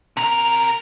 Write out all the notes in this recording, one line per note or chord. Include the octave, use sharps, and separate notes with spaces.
C3 A#4